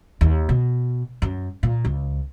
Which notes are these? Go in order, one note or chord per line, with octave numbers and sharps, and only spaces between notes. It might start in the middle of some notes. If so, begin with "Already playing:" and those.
D#2
B2
F#2
A#2
C#2